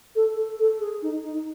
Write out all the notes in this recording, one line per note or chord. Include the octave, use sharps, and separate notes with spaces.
A4
A4
A4
G#4
D#4
D#4